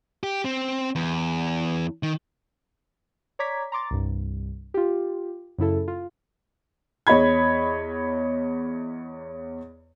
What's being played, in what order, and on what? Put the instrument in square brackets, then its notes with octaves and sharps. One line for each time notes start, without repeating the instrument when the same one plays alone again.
[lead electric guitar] G4
C4
E2
D#3
[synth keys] C#5 D5 A#5 D6 G#6 B6
A#5 C6 D6 A6
C2 G2
F4 G4
F#2 C#3 E4 A4
F4
[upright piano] E2 C#5 D#5 B5 G#6